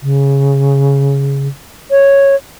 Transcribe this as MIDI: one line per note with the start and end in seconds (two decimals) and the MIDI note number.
0.02 1.48 49
1.91 2.35 73